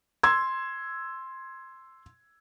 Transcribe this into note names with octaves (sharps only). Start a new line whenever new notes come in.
C6 E6 G#6